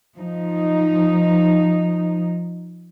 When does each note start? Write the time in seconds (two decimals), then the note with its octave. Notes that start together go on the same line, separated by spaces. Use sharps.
0.15 F3 D#4